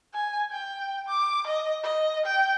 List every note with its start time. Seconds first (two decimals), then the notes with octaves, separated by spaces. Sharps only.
0.13 G#5
0.52 G5
1.08 D6
1.47 D#5
1.83 D#5
2.26 G5